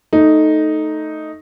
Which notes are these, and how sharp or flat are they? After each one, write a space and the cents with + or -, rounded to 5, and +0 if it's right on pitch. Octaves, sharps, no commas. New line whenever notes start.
A3 +0 D#4 +0